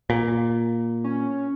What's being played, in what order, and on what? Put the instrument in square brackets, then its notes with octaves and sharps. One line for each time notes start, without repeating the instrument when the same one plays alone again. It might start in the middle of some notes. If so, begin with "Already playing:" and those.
[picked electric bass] A#2
[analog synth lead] C#4